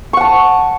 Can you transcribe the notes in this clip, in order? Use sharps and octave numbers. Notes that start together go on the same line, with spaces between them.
F#5 A5 C#6